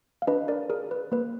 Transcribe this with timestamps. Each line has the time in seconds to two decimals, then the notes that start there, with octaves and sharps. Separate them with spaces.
0.22 F5
0.27 D4 B4 D#5
0.48 A#4 D5
0.70 G#4 A#4
0.91 B4
1.12 A#3 B4